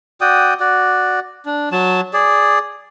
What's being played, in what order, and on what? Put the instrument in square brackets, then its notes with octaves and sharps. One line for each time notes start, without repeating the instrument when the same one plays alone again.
[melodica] F#4 D5 G5 D#6
F#4 D5
D4
F#3 A5
G#4 D5